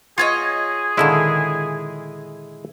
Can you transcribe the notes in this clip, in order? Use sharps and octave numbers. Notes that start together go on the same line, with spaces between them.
B3 F4 G#4 C#5 D#5
A#2 D3 D#3 G#3 E4